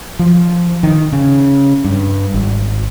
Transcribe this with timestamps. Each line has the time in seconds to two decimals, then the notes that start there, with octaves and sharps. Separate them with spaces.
0.19 F3
0.83 D#3
1.13 C#3
1.84 G2
2.34 G#1